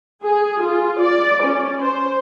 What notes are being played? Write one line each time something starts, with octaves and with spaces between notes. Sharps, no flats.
G#4
F4
D5
C#4
C5